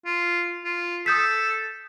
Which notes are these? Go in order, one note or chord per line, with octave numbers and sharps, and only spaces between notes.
F4
F4
A4 D#6 G6 B6